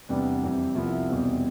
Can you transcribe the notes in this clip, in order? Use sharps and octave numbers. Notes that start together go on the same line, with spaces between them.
E2 C3 G3 B3 D4
F2 E3 G3 C4 G4
C2 C3 F3 B3 E4
F1 E2 B2 G3 C4